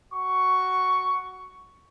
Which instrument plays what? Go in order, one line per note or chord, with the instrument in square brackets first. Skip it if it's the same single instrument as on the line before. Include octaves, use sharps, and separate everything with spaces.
[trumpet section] F#4 C#6